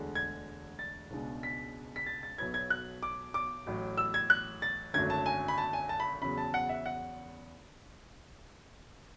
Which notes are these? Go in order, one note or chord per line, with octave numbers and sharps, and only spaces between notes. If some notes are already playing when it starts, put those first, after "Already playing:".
Already playing: E1 D2 D3 G#3
G#6
A6
C#2 B2 G#3 D4
B6
B6
A6
A6
B1 B2 F#3 B3 G#6
G#6
F#6
D6
D6
A1 A2 F#3
E6
G#6
F#6
A6
G#1 F#2 D3 F#3 A3 G#6
A5
G#5
B5
A5
G#5
A5
B5
E2 C#3 F#3 B5
A5
F#5
E5
F#5